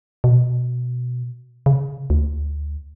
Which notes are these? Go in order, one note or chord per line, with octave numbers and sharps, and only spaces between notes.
B2
C#3
D2